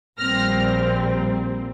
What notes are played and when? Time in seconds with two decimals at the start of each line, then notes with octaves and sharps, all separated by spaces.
0.18 A#1 A#2 G3 C4 F6 A#6